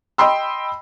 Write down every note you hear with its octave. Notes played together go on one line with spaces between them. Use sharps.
D#5 G5 B5 C6 E6